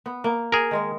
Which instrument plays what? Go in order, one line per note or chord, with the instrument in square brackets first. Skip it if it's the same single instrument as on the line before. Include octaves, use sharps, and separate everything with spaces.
[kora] B3
A#3
[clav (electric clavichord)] G#4 A#4
[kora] D#3 G#3 D#5